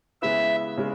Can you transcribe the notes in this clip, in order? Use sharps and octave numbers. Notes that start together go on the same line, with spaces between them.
C#3 G#3 B3 E4 B4 E5
C#3 G#3